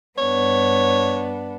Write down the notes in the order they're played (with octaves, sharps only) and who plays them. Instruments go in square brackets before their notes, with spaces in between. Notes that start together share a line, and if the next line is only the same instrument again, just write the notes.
[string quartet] G2 B3 D4 [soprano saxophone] C#5